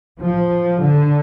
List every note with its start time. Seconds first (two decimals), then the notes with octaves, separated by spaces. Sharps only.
0.21 F3
0.79 D3